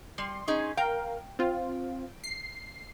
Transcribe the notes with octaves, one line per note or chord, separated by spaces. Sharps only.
G3 C6
C#4 D#4 G#4
A#4 F5 G5
C4 F4
C7